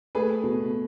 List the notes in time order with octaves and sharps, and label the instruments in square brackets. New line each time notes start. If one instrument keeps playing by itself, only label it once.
[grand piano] A3 G#4 B4
B2